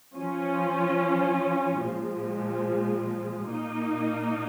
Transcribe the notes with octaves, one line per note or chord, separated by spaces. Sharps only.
F3 C#4 F4
A#2 F3 G#3
A#2 A#3 D#4